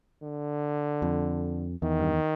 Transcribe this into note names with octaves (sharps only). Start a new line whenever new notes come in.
D3
F2
E2 D#3
G2